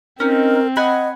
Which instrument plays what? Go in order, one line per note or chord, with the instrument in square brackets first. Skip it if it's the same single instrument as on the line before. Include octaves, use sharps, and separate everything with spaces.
[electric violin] C4 [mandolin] C#4 D#4 [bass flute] A#4
[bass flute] D#5 [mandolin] F#5 G#5 B5